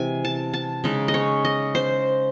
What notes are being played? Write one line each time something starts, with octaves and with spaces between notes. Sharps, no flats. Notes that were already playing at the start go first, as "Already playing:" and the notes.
Already playing: C3 E3 G#3 G#5
A5
A5
C#3 G#3 D#4
D#5
C#5
D#5
C5